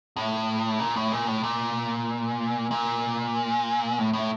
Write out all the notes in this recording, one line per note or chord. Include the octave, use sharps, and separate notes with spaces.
A2
A#2
A2
A#2
A2
A#2
A#2
A2
A2